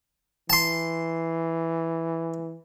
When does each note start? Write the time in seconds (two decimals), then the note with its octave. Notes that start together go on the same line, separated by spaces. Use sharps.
0.50 E3 A5 C6